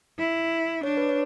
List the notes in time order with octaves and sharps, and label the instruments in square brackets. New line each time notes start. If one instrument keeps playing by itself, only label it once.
[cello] E4
[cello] D4 [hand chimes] C#5
[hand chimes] B4
C#5